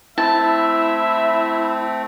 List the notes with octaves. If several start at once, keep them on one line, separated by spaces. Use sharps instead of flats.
A3 C4 E4 E5 A5